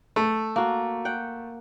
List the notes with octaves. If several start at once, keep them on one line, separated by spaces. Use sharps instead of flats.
A3
A#3 F#4
F#5 G5